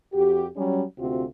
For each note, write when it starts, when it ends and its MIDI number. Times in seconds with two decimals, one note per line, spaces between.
0.13 0.46 41
0.13 0.46 66
0.13 0.46 67
0.56 0.83 54
0.56 0.83 55
0.56 0.83 61
0.99 1.23 38
0.99 1.23 48
0.99 1.23 60
0.99 1.23 65
0.99 1.23 66